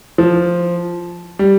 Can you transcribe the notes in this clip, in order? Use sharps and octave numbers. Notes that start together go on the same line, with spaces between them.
F3
G3